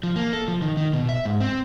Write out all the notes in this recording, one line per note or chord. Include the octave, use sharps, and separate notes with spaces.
F3
A#3
A4
F3
D#3
D#3
B2
E5
G#2
C4